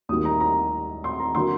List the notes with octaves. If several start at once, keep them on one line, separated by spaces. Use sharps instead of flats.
D#2 D#3 G3 A#3 D#6
A#5
A#5
C6
A#5
D3 F#3 A#3 C6